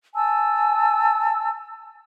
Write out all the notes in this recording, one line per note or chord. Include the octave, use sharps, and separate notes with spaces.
G#5 A5 E6